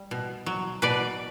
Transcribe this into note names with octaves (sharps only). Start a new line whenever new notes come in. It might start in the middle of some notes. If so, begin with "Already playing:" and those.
Already playing: G3
B2
F#3
B2 B4 D5